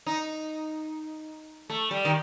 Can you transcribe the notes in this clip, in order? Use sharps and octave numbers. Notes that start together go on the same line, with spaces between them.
D#4
A3
G3
D#3